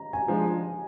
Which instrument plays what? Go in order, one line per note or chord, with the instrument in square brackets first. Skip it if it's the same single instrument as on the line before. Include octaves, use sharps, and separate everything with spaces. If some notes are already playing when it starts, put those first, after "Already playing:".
Already playing: [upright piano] A#5
G#5
[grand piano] F3 G#3 D4